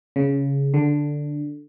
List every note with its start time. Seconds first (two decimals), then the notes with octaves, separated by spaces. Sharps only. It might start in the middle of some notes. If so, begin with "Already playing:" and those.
0.16 C#3
0.74 D3